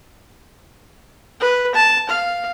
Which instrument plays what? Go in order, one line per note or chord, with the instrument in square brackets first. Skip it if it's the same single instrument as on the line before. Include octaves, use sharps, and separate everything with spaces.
[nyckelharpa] B4
A5
F5